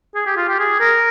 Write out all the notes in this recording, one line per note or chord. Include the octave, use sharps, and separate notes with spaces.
G#4
G4
F4
G4
G#4
A#4